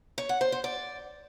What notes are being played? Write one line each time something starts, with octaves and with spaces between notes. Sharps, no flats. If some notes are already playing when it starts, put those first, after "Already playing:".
C#5
F#5
C5
C5
D5